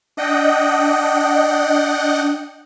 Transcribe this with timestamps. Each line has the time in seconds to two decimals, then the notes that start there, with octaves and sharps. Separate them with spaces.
0.17 D4 D#5 F#5 G5